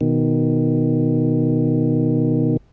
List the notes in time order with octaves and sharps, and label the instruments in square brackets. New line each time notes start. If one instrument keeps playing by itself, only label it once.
[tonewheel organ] B2 D#3